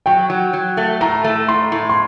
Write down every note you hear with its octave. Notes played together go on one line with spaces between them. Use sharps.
F#3 G5
F#3
F#3
A3
A2 A#5
A3
A2 C6
A2
C6